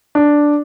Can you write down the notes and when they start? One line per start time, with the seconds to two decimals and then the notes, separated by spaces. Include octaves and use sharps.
0.15 D4